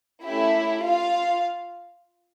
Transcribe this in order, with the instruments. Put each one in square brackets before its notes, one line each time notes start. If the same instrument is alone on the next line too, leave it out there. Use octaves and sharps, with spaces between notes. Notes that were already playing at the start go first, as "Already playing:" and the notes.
[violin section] A3 C#4 E4 G4 E5
F4 F5